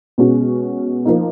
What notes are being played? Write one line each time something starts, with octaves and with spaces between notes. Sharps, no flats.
B2 G#3 C#4 F#4
F3 A#3 D#4